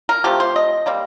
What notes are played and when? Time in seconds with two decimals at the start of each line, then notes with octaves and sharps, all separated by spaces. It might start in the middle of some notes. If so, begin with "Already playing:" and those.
0.09 A#4
0.24 C3 F3 A3 G4
0.40 C5
0.56 D#5
0.86 C3 G3 A#3